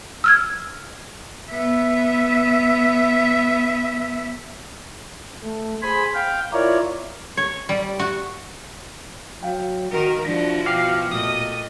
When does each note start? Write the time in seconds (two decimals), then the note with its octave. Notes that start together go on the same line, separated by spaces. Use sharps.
0.24 E6 F6 G#6
1.51 B3 E5
5.43 A3
5.82 G#4 C5 G#5 B5
6.15 F5 G5
6.53 E4 F4 A#4 C#5 D5
7.37 C#5
7.69 G3
7.99 F#4
9.43 F#3 F5 G5
9.91 D#3 F#4 A#4
10.25 F3 D4 E4 F#4 A#6 B6
10.66 B2 F5 G5 D6 F6
11.11 A#2 A3 D#5 D#6